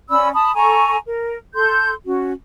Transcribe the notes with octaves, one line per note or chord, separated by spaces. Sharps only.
C#4 D5 B5 E6
A5 B5 D#6
A4 G#5 A#5 C#6
A#4
A4 C6 G6
C#4 F#4